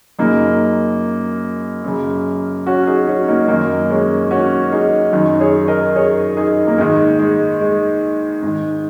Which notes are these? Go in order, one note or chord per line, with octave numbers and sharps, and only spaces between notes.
F#2 C#3 A#3 D#4
F#2 C#3
C#4 F#4
D#4 G#4
C#4 F#4
A#3 D#4
F#2 D#3 A#3 D#4
G#3 C#4
C#4 F#4
D#4 G#4
F#2 D#3
G#4 C#5
A#4 D#5
G#4 C#5
D#4 G#4
A#3
G#2 D#3 G#3
G#3
G#3
G#2 D#3